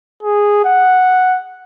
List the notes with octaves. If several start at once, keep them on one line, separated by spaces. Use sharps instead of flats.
G#4
F#5